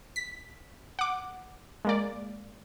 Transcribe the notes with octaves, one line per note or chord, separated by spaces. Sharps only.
B6
F#5 D6
G#3 A#3 D5